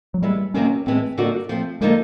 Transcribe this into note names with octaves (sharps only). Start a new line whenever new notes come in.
F#3
G3 G#3 B3 E4
C3 D#3 F#3 A#3 C#4
A2 E3 G#3 C4
D3 G3 A#3 D#4 F#4
F3 A3 C4
D3 F3 G#3 A#3 D#4